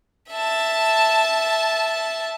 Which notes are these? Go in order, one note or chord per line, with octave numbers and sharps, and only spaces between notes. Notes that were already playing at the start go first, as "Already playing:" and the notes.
E5 A5